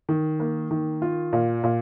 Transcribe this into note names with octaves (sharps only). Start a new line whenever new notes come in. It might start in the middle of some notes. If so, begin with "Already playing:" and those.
D#3
A#3
D#3
F4
A#2
A#2